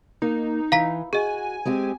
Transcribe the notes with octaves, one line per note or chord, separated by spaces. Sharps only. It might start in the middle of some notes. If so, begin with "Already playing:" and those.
A#3 D#4
E3 F5 A#5 B6
F#4 G#4 D#5 G#5
G#3 C4 G4